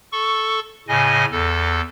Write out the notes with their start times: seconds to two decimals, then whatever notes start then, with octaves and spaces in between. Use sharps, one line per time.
0.12 A4 C#6
0.88 A2 C#3 D#5 G#5
1.31 E2 A4